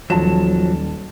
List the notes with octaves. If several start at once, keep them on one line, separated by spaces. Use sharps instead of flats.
D#1 F3 F#3 A5 E7